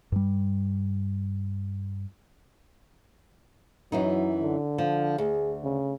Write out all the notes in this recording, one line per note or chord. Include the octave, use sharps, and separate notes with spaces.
G2 G3
F#2 E3 F#3 D#4
D3
F3
D2 G#4
C#3